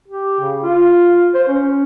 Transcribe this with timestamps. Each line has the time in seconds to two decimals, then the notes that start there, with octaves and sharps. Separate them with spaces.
0.08 G4
0.40 C#3
0.63 F4
1.34 C5
1.48 C#4